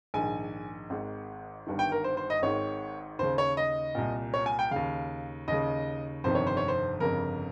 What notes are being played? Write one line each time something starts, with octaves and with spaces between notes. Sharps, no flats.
A#1 G#2 D#3 G#5
G#1 G#2 D#3
G1 G2 D#3
G5
A#4
C5
C5
D#5
G#1 G#2 D#3 C#5
D#2 C#3 C5
C#5
D#5
C2 A#2
C#5
G#5
G5
D#2 C#3 F5
D#2 C#3 D#5
G1 F2 C3 D#3 C5
C#5
C5
C#5
C5
G1 F2 C#3 A#4